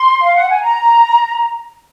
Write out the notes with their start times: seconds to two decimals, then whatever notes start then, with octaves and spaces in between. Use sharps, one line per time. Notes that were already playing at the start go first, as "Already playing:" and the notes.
Already playing: C6
0.21 F5
0.35 F#5
0.48 G#5
0.61 A#5